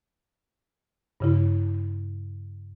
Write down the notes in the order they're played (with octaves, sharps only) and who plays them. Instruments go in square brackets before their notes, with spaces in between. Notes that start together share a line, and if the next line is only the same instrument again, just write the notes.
[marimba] G2 C#3 E4